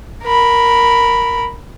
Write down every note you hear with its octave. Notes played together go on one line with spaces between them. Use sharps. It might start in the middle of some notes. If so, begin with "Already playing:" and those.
A#4 B5